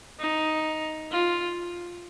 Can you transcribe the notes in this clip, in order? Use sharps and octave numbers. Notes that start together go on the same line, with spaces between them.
D#4
F4